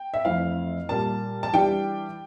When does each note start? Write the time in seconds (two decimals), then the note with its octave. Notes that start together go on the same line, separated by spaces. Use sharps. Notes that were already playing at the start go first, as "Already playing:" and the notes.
Already playing: G5
0.14 E5
0.25 F2 E3 A3 C4 E4 F5
0.89 A#2 G3 A#3 A5
1.43 A5
1.53 E3 G3 D4 G4 G5